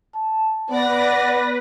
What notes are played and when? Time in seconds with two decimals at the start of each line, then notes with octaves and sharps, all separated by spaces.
0.15 A5
0.71 B3 B4 D5 A#6